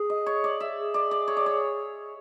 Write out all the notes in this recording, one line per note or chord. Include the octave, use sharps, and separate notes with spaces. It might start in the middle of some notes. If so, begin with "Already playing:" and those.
Already playing: G#4
D#5
C#5
D5
E5
G#4
D5
D5
C#5
D5
C#5